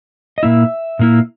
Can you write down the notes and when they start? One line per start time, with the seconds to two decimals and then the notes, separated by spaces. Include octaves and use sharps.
0.38 D#5
0.43 A#2 A#3 E4 E5
0.99 A#2 A#3 E4